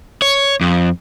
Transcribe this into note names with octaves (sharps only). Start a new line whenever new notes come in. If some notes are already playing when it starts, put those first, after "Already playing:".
C#5
F2